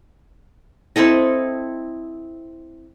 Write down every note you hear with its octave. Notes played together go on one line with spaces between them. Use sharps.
C4 E4 A4 D#5